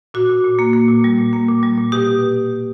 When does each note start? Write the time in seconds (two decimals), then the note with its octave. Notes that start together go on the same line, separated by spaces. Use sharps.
0.14 A#2 F#4
0.29 A#2
0.44 A#2
0.59 A#3
0.73 A#3
0.88 A#2
1.04 G3
1.18 A#2
1.33 A#3
1.49 A#2
1.63 G3
1.77 A#2
1.92 B2 G4
2.08 B2